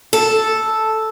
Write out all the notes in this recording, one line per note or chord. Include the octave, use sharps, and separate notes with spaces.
A4